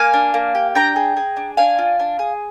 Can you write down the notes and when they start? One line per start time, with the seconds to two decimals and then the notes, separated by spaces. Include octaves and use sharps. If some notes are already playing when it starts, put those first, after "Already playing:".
Already playing: A#3 F5 G#5
0.14 D4
0.34 A#3
0.55 G4
0.75 D4 G5 A#5
0.96 G#4
1.17 G#4
1.37 D4
1.57 D4 F5 G#5
1.79 F4
1.99 D4
2.19 G#4